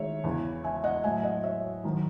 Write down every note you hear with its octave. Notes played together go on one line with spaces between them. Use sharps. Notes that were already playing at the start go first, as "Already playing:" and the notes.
Already playing: D#3 G#3 C#5 E5
E2 C#3 E3
E5 G#5
D#5 F#5
A2 F#3 E5 G#5
D#5 F#5
C#5 E5
F#2 D#3 F#3